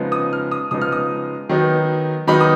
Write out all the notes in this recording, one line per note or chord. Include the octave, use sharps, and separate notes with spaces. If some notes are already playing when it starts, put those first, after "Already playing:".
Already playing: C#3 F3 G#3 B3 D#4
D#6
F6
D#6
C#3 F3 G#3 B3 D#4 D#6
F6
D#6
D#3 F#3 B3 D#4
D#3 F#3 B3 D#4 B5
D#6